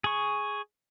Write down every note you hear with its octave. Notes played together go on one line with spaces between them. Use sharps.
G#4 C#6